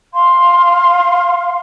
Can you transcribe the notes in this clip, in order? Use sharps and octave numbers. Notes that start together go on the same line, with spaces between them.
F5 C6